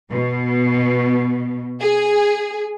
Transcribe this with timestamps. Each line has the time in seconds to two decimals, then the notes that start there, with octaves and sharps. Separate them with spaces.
0.10 B2
1.82 G#4